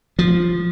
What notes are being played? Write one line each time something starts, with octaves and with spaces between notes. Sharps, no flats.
F3